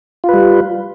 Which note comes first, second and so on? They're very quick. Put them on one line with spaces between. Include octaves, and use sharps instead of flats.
F4 B4 G3